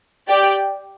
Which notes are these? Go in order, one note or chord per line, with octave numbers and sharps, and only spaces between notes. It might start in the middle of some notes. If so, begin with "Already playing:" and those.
G4 D5 G5